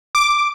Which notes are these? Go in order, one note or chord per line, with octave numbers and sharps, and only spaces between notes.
D6